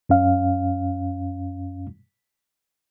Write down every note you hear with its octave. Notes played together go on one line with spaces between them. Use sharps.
F#2 C#4 F5